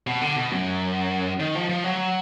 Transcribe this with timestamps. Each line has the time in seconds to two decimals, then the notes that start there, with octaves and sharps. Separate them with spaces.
0.07 B2
0.21 D3
0.36 B2
0.52 F#2
1.40 D#3
1.55 F3
1.69 F3
1.84 F#3